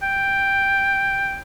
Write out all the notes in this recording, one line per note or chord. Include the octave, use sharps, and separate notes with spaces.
G5